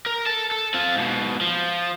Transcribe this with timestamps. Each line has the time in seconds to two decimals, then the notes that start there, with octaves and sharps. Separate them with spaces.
0.06 A#4
0.26 A4 A5
0.51 A4
0.74 C4 F4
0.96 G#2 B2
1.41 F3